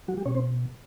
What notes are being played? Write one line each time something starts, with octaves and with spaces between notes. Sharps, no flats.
F#3 F#4
G3 G4
B2 C#4 C#5
C4 C5